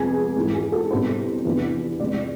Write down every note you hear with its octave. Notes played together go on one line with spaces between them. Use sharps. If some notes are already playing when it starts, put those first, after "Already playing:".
Already playing: F2 C3 G#3 B3 G#4
G#2 E3 A3
G#4
A4
C2 B2 B3 D4 C5
E2 C3 F3 B3 D4
C3 G#3 C4 D5
D5